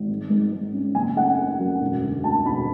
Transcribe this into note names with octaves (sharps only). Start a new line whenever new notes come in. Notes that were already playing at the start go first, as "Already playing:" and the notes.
Already playing: G#1
G#2
G#2
G#2
C#4
F#1 G#5
A3 F#5
A3
F#2
E1
D3
D2 A5
E1 B5